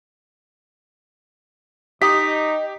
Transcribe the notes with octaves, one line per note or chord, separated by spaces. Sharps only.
D#4 G4 D#5 B6